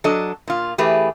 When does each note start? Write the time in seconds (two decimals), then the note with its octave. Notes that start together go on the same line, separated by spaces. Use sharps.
0.04 F#3 D4 A4 D#5
0.48 A#2 F4
0.78 E3 A3 G4 G#4 B4